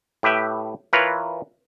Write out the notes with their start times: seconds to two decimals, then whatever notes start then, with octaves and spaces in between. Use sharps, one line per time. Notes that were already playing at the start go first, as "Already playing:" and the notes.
0.23 A2 G4 B4 E5 G5
0.93 E3 F4 A#4 B4 C#5